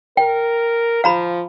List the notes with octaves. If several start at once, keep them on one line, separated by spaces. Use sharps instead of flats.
A#4 G5
F3 F5 A#5 B5